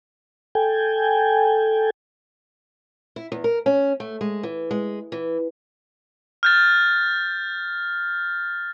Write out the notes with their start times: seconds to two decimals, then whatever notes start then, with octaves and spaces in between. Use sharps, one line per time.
0.55 A4 G5 G#5
3.16 E4
3.32 E2
3.44 A#4
3.66 C#4
4.00 A3
4.21 G#3
4.43 E3
4.71 G#3
5.12 E3
6.43 F6 G6 A6